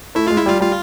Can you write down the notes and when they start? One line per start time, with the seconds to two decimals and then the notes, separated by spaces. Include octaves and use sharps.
0.15 A3 E4
0.28 G#3 F4
0.38 E4
0.46 G3 F4
0.60 G3 F4